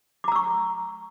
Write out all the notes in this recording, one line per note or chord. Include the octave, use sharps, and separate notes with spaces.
A#5 C#6 D6 E6